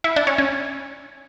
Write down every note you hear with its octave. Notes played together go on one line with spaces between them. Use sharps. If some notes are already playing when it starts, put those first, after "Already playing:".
E4
D4
C#4
C#4